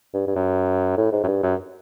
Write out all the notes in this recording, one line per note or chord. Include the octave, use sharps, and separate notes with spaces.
G2
G2
F#2
A2
G#2
F#2
G2
F#2